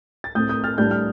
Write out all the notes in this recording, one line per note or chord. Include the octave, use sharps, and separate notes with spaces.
A6
A2 A3 C4 D#6 G6
D#6 G6
F6 A6
A2 G3 D4 G6
F6